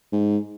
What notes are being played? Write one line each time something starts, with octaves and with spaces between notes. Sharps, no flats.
G#2